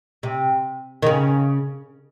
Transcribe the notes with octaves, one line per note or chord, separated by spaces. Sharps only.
C3
D#3
C#3